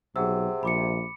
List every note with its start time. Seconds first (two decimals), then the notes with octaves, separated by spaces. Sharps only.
0.16 B1 C3 G#4 F#5 E6
0.63 A#1 B5 D6 C#7